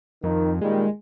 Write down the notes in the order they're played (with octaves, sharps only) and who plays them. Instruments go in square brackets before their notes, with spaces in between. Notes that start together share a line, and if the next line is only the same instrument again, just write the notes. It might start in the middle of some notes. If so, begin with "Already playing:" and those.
[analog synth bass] F2 [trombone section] D#3
[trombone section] A#2 D#3 G3 [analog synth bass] G#3